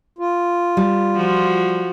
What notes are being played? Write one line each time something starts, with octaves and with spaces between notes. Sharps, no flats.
F4
G3
F3 F#4